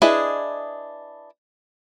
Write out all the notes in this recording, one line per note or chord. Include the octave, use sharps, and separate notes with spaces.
D4 E4 G#4 B4 D#5